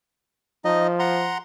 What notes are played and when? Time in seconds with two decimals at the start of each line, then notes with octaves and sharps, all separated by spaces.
0.65 F3 D#4 D#5
0.99 F#5 A#5 C6